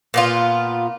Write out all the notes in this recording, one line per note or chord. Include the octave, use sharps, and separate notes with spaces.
A#2 B3 F4